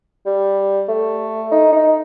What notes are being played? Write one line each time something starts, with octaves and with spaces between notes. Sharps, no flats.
G3
A3
D#4
D#4